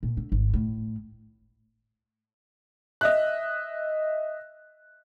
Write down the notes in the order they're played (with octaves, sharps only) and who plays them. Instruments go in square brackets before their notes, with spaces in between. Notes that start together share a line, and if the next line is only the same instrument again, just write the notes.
[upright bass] A#2
D3
G#1
A2
[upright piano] D#5 E5 F#6